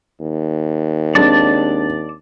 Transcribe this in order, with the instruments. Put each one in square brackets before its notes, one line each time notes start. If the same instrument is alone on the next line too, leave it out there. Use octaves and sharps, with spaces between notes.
[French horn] D#2
[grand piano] G#3 C4 D4 [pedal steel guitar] D5 A5